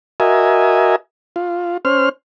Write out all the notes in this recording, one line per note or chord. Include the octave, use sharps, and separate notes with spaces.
F#4 A#4 D#5 E5 G#5
F4
C#4 C5 F6